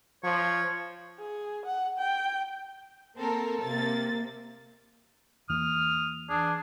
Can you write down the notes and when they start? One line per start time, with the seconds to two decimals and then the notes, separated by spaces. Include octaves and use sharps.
0.24 F3 C#5
1.19 G#4
1.65 F#5
1.98 G5
3.18 A#3 C4 A4 A#4
3.64 C3 A#3 A6
5.49 E2 E3 A#3 D#6 F6
6.30 E3 D4 G#4